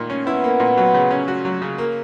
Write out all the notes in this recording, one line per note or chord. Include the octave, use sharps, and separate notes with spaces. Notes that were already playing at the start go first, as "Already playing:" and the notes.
Already playing: A#2 D#3 A#3
C#4
B3 E4
A#3
A#2
F#3
C#3
C#4
F#4
F#3
C#3
A#3